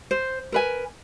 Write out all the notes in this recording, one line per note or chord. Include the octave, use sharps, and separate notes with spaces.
C5
A#4 B4 G#5